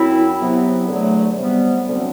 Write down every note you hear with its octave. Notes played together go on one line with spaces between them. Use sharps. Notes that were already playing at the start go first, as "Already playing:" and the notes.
Already playing: F#2 F#3 C4 E4
C3 F#3 B3
E2 D3 F#3 A3
C3 G3 B3
D2 D3 F#3 C4